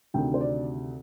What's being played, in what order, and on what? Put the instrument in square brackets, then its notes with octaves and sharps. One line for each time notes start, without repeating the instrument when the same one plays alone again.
[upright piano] D2 C3 D#3 G5
C5
D5